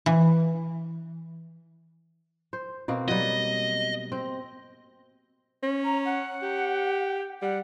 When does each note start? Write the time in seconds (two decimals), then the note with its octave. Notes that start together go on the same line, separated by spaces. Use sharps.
0.06 E3
2.53 C5
2.88 B2 A#3 C4
3.08 F#3 G3 D#5
4.12 C4
5.63 C#4
5.85 A#5
6.05 F#5
6.42 G4
7.42 G3 F#5